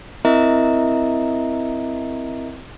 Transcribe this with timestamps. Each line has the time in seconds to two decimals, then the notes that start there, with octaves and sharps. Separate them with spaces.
0.25 C4 E4 A#4 D#5 E5 A#5